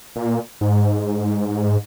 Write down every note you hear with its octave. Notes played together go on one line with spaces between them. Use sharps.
A#2
G#2